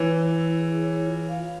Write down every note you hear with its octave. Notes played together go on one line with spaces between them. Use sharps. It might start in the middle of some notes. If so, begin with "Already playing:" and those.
Already playing: E3 C#5
E4
E4
G#4
C#5
F4
F5